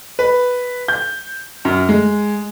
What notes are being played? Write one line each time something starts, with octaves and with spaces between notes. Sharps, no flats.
B4
G6
F#2
G#3